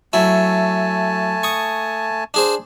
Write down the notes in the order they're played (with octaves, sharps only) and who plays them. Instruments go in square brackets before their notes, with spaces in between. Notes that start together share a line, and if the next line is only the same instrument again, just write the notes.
[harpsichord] F#3 E4 [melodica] A3 G#5 A5
[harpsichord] C#6 D#6
D4 G#4 C5